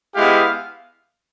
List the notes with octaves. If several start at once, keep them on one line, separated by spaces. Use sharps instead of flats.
G#3 B3 E4 G4 F5